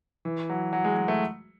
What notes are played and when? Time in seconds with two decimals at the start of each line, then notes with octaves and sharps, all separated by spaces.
0.25 E3
0.50 F#3
0.73 F#3
0.84 G#3
0.97 G#3
1.08 A3